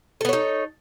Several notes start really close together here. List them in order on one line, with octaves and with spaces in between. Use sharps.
A4 B3 C#5 D#4